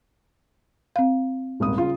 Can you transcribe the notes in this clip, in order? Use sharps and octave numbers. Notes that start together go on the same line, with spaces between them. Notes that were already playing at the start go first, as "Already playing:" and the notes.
C4 F5
D#1 G#1 D#6
C#3 F4